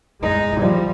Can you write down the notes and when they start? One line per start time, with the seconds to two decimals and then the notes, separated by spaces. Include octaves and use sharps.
0.21 G#3 D#4
0.58 F3 G3